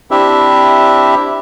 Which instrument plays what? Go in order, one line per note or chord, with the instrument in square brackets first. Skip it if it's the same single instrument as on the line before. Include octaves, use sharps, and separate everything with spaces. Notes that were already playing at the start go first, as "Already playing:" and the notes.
[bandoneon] C4 D4 E4 G4 E5